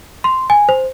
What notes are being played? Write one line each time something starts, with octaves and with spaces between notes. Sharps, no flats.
C6
G#5
C5